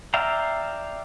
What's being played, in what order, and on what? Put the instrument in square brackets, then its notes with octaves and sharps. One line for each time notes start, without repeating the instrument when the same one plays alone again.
[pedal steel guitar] D5 E5 F5 G5 A#5